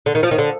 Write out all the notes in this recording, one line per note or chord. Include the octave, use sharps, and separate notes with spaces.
D3
D#3
F3
D#3
D3